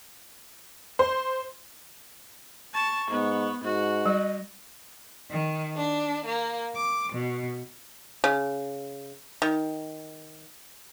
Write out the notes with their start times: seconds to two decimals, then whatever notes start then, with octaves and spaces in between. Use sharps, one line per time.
0.99 C5
2.74 A5 C#6
3.10 G#2 B3
3.64 G#2 F#4
4.06 G3 D#5
5.29 D#3
5.74 D4
6.24 A#3
6.75 D6
7.11 B2
8.24 C#3
9.42 D#3